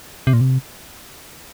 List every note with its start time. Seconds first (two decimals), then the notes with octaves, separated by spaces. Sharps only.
0.27 C3
0.33 A#2
0.41 C3